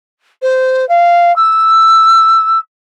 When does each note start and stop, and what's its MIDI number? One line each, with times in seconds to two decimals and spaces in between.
0.42 0.87 72
0.89 1.34 77
1.36 2.58 88